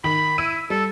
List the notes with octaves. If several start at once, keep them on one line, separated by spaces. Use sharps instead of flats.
D#3 B5 F#7
E4 E6 D#7
G3 A4